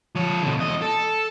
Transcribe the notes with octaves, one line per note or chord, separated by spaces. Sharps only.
F3 C#5
B2 D3
E2 D#5
A4